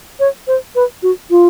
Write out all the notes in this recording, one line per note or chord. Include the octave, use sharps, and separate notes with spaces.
C#5
C5
B4
F#4
F4